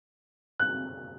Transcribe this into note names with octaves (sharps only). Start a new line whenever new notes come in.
F#6